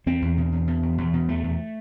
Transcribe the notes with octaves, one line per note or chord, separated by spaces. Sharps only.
E2 C4
E2
B2
E2
B2
E2
E2
B2
E2 A3
E2